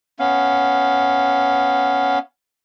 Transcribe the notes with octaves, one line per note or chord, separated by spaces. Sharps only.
B3 C#4 F5